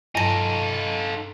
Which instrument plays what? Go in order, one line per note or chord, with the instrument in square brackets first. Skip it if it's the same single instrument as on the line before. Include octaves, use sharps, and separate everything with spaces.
[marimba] G2 A#6 [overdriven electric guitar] D#4 A4